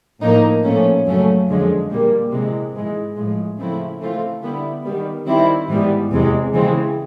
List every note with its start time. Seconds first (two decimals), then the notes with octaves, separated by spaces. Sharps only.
0.21 A2 F3 A#3 D#4
0.64 A#2 F3 A3 C#4
1.05 F#2 C#3 F#3 A3 C#4
1.48 F2 D3 F3 G#3
1.90 A#2 G3 A#3
2.32 C3 E3 G#3
2.74 G#2 E3 G#3
3.16 A2 F3 G#3
3.58 C#3 F3 A3 C4 E4
4.01 E3 A3 C4 F4
4.42 D3 G3 B3 E4
4.84 D#3 G3 B3
5.26 D#3 G3 C4 E4
5.68 G#2 E3 G3 B3
6.11 E2 C3 E3 G#3
6.53 C#3 E3 G#3 C4